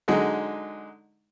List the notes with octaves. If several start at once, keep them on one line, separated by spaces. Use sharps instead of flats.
D3 F#3 G#3 D#4